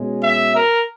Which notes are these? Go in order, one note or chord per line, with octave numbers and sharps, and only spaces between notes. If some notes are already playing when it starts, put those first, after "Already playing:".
Already playing: B2 G#3 C#4
E5
A#4